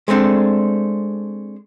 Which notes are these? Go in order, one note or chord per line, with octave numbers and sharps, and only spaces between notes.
G#3 A3 C4 D4